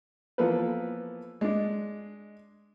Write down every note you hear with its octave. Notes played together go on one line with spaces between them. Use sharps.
E3 F3 A#3 B3 A4 B4
G#3 D4